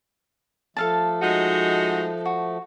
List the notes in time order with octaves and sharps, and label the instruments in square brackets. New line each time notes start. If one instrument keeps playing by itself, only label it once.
[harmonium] F3 A3 [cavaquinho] A4 F5 A5
[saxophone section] G#3 D#4 F#4
[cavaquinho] F#4